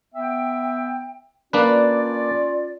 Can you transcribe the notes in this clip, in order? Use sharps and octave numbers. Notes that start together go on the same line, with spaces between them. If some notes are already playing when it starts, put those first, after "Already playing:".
B3 E5 G5
A#3 C#4 D4 F4 B4 D5